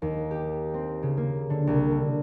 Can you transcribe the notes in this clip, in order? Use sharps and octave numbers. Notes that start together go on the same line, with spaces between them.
D#2
G4
C4
C#3
A#3
D3
C2
D3